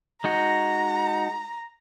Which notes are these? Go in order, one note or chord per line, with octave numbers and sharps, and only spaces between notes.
G#3 D#4 F#4 A#5